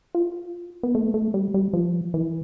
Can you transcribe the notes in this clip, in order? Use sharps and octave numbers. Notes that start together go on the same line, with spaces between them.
F4
B3
A3
A3
G3
G3
F3
E3